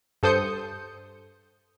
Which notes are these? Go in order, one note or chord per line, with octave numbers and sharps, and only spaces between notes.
G2 A4 C5 D#6 G6 C#7